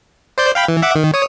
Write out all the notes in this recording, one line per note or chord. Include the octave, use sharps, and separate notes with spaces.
C5 D5 G6
F5 G5 B5
E3
E5 F#5 D6
D#3
C#5 D#6